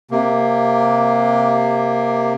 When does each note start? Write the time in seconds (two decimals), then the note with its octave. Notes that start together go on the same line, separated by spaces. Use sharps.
0.11 C3 A#3